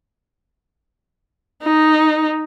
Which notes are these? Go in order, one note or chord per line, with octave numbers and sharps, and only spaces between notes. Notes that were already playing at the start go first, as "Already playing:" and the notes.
D#4